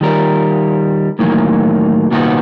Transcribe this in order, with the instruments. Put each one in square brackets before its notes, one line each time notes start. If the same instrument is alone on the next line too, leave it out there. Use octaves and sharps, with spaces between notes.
[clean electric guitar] D#3 G3 A#4
A2 D#3 E3 F#3 A#3
C2 A#2 D#3 B3 F#4